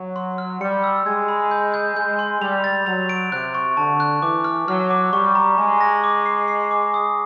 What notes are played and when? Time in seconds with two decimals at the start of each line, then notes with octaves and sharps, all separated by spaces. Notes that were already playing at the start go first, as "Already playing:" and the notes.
Already playing: F#3
0.16 C6
0.38 F6
0.61 G3 C#7
0.84 E6
1.06 G#3 G#6
1.28 B5
1.51 G6
1.74 G6
1.96 G#3 G6
2.19 C6
2.41 G3 F7
2.64 A6
2.86 F#3 F7
3.09 D7
3.32 C3 F#6
3.54 C#6
3.77 D3 A5
4.00 F#6
4.22 E3 D6
4.44 F6
4.68 F#3 F6
4.90 D6
5.13 G3 C#6
5.35 A#5
5.58 G#3 A#5
5.81 A#6
6.04 D6
6.26 C7
6.48 C7
6.71 D6
6.94 D#6